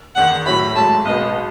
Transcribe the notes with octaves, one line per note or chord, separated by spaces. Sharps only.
F#1 E2 D#3 F#5
A2 F#3 C#4 E4 B5
G#1 G#2 F#3 A3 A5
B1 B2 G#3 B3 D#5